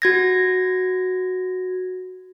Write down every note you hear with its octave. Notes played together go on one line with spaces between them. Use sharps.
F#4 G#6 A#6